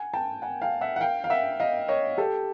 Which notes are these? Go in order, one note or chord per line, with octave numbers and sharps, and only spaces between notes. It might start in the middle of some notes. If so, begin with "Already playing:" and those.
Already playing: F#5 G#5
G5 A5
F#5 G#5
F5 G5
E5 F#5
F#5
F5 G5
F5
E5 F#5
D#5 F5
C#5 D#5
G4 A4